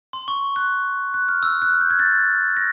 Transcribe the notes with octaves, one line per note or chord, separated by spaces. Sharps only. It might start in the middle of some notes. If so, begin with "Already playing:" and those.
C6
C#6
F#6
F#6
F6
E6
F#6
F6
G6
F#6 G#6
G6 A6
A#6